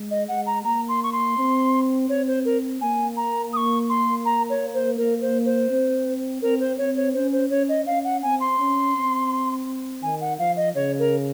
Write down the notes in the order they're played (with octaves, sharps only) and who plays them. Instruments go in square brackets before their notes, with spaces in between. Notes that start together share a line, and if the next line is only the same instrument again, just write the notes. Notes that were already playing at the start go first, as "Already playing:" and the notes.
Already playing: [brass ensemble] G#3
[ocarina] D#5
[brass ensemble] G#3 [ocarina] F#5
[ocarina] A#5
[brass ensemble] A#3 [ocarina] A#5
[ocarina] C6
C#6
C6
[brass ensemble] C4
[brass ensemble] C4 [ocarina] C#5
[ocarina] C5
A#4
[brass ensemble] A#3 [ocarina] G#5
[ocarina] A#5
D#6
C#6
C6
A#5
C#5
C5
[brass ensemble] A#3 [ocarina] A#4
[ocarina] C5
C5
[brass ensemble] C4
[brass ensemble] C4 [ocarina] A#4
[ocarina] C5
[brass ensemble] C4 [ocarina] C#5
[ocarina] C#5
[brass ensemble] C#4 [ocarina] C5
[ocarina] C5
[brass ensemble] C#4 [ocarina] C#5
[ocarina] D#5
[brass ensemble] C#4 [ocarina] F5
[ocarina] F#5
[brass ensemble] C4 [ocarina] G#5
[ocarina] C6
[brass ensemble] C#4
C4
[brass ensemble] D#3 [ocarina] G#5
[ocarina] F#5
[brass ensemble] F3 [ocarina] F5
[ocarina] D#5
[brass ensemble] C#3 [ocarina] C#5
[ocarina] A#4